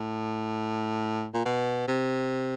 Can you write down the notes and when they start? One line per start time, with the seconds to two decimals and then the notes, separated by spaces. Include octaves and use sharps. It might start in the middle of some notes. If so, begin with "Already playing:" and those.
Already playing: A2
1.34 A#2
1.45 B2
1.88 C3